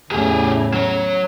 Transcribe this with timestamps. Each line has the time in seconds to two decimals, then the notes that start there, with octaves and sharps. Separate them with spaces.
0.12 E2 A2 C#3 G4 G#4
0.74 F#3 C#5